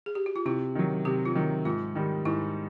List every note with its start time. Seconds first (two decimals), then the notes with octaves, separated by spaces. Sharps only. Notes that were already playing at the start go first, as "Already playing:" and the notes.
0.06 G#4
0.15 G4
0.26 F#4
0.36 F4
0.45 C3 E4
0.75 D#3 F#3
1.05 C3 G4
1.25 F4
1.35 D#3 F#3
1.65 G#2 F4
1.95 D#3 G3
2.25 G#2 E4